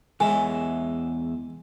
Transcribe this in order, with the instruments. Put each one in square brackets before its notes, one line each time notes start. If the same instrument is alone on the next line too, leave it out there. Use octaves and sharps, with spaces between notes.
[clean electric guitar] E2 C#5 E5 [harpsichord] G#3 [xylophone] G#5